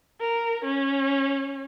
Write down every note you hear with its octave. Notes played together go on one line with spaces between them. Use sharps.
A#4
C#4